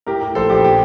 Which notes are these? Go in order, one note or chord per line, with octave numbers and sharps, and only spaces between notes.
A2 G4 A#4
A2
A#1 A4 C5
A#1 G4
G4